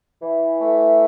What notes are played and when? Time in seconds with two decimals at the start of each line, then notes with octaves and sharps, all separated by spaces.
0.21 E3
0.61 A3